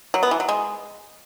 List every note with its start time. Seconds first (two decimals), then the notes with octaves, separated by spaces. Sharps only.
0.14 F#3
0.23 B3
0.31 E3
0.40 F#3
0.49 G#3